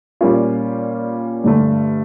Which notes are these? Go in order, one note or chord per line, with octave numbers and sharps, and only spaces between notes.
A#2 G3 A#3 C#4 F4
G2 D3 A3